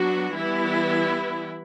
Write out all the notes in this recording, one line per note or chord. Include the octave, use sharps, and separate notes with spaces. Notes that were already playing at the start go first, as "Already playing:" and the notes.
Already playing: F#3 B3 D4 F#4
E3 G3 B3 E4